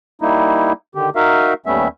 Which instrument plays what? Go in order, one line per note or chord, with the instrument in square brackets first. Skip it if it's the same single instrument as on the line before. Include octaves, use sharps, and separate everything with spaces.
[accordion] G3 A#3 D#4 E4
D3 D#3 G4
D#4 F#4 A#4 E5 F5
D#2 G3 A3 B3 C#4 E5